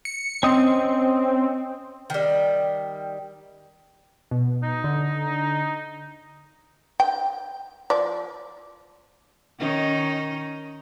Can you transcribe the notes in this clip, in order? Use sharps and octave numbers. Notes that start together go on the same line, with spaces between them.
C#7
C4 C#4 D#5
D#3 G3
B2
D#4
D3
G5
F3 D5
D#3 C#4 D#4